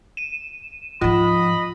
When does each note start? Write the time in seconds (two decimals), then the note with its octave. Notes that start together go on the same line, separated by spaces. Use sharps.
0.17 D#7 E7
1.01 G#2 F3 F4 D#5 B5